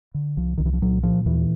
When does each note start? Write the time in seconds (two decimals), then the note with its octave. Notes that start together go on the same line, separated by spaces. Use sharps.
0.14 D3
0.37 C2 F3
0.58 C2 D#3
0.66 E3
0.73 F3
0.82 A#2 F#3
1.03 A#2 F3
1.26 D#2 E3